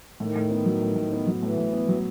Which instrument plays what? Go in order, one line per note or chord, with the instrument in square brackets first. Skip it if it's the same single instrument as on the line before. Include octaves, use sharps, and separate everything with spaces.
[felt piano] A2 [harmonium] D#3
[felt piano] A2
B3
F#3
A2
A2
B3
F#3
[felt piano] A2 [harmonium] E3
[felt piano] A2
B3
F#3